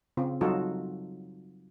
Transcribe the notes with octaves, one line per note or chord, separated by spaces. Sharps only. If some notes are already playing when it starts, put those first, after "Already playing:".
C#3 C4 F4
F#3 G3 D#4 F4 F#4 A4